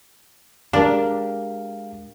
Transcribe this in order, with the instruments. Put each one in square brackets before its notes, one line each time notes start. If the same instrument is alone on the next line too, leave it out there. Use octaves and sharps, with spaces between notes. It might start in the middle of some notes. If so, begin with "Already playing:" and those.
[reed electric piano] G#3 F5 [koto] D4 [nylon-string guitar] G4 A#4